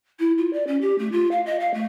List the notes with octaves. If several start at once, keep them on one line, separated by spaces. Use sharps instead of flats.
E4
F4
D5
C#4
G4
A3
F4
F5
D#5
F5
A3